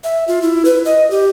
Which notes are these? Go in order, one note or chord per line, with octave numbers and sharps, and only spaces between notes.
E5
F4
E4
B4
D#5
G4